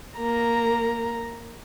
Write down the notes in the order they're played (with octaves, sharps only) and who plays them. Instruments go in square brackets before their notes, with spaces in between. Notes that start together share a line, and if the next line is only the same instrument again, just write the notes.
[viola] A#3 A#5